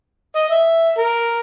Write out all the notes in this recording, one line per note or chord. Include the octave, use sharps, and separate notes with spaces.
D#5
E5
A#4